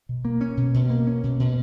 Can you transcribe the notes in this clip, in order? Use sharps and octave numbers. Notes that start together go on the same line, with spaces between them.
B2
A#3
C#4
B2
B2
A#3
C#4
B2
B2